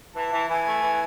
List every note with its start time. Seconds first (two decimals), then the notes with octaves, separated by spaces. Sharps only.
0.15 E3 A5
0.32 E3
0.49 E3 G#5
0.65 A3
0.82 E3